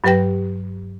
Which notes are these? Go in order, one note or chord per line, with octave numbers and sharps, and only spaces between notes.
G2 F#3 G4 B4 G5 A#6